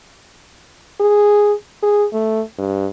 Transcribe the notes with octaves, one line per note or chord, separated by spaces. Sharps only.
G#4
G#4
A3
G2